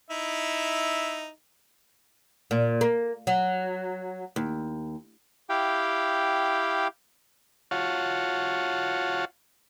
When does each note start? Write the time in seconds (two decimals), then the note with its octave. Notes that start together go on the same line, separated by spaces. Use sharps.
0.10 D#4 E4 E5
2.51 A#2
2.81 A#3
3.27 F#3
4.36 D#2
5.49 E4 G4 F5 G5
7.71 F4 F#4 C#5 F5 F#5 A5